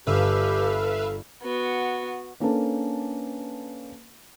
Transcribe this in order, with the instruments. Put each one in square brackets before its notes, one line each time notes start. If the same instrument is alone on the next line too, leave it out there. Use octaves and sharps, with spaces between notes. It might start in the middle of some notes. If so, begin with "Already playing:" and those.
[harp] G1 E6 [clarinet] G4 [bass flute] A4 [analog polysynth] B4 E5 F5
[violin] B3 F#4
[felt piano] A#3 C#4 D4 A4 B4 A5